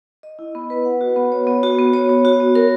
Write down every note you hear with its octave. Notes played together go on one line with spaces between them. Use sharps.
D#5
E4
B3
B4
F#5
F#4
B3
C#5
B3
F#4
B3
C#5
B3
F#4
B3
A#4